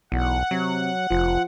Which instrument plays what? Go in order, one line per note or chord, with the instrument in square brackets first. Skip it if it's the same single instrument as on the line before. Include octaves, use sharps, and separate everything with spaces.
[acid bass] B1 [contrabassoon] E2 [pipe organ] F#5
[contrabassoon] C3 [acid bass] F#3
[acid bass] F1 [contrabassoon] F3